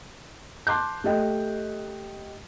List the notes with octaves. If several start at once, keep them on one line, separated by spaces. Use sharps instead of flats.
A5 C6 D6 F#6 G6
A3 G4 D#5 G5